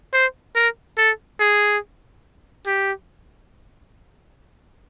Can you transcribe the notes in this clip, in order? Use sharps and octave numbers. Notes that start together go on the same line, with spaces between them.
C5
A#4
A4
G#4
G4